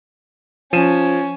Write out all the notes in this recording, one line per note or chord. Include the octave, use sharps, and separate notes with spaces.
F3 C#4 D#7 E7